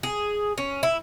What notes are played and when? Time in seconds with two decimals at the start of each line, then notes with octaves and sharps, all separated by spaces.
0.03 G#4
0.58 C#4
0.83 E4